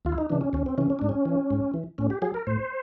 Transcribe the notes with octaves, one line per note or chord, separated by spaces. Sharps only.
D#2 F4
E4
D#4
C#3 E3 D4
C#4
D#2 C#4
C4
C#3 E3 C#4
C#4
G#2 D4
C#4
E3
G#2
E3
A2 C#4
G4
F#3 G#4
A#4
A2 C5